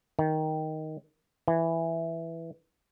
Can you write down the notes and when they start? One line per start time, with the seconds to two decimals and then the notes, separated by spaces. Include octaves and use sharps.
0.19 D#3
1.48 E3